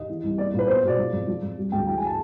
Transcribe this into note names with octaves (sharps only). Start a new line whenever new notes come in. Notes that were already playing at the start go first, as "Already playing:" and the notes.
Already playing: D#2 D#5
E3
C2
A#3 D5
A#2
B4
B3 C5
B2 D5
F3
F2
F3
F2
G3
D2 G5
E3 G5
G#5
A5